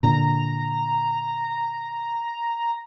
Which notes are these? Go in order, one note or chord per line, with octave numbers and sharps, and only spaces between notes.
A#2 D3 A#5